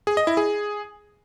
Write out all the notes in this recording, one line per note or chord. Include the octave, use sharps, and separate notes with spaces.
G#4
D#5
E4
G#4